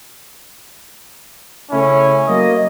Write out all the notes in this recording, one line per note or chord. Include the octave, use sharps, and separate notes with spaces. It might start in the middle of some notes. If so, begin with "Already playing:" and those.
C#3 A3 C#4 E4
F#3 A#3 D#5